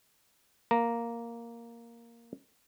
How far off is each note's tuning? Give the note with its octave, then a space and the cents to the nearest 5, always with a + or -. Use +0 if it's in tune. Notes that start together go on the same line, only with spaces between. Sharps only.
A#3 +0 A#5 +0